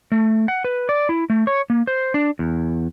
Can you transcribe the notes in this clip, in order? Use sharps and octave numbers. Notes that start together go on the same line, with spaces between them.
A3
F#5
B4
D5
E4
A3
C#5
A#3
C5
D4
E2